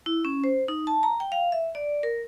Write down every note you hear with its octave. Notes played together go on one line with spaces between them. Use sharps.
E4
C#4
C5
D#4
A5
A#5
G5
F5
E5
D5
A#4